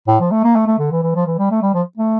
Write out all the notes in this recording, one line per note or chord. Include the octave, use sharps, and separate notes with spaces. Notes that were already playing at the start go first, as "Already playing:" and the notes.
A2
F3
A3
A#3
A3
A3
D3
E3
E3
F3
E3
G3
A3
G3
F3
A3